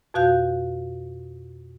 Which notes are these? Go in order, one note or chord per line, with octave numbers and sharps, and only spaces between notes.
F2 B2 F#4 F5 G6